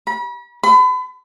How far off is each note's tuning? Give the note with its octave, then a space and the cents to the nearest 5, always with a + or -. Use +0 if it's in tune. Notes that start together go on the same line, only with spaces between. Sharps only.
B5 -40
B5 +35